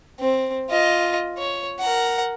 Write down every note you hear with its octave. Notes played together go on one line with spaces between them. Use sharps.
C4
F4 D#5
C#5
A#4 F#5